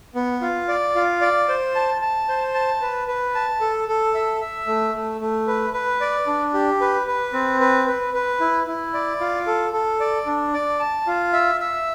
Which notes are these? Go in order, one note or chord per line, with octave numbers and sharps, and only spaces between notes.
B3
F4
D5
F4
D5
C5
A5
A5
C5
A5
B4
B4
A5
A4
A4
E5
E5
A3
A3
A3
B4
B4
D5
D4
G4
B4
B4
C4
B4
B4
B4
E4
E4
D5
F4
A4
A4
D5
D4
D5
A5
F4
E5
E5